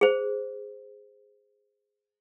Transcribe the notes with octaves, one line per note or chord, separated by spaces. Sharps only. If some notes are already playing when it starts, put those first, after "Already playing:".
G#4 C5